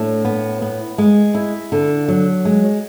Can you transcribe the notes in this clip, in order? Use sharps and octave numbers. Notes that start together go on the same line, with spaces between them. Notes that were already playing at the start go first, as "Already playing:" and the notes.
Already playing: A2 D4
B3
B3
G#3
E4
D3
F#3
G#3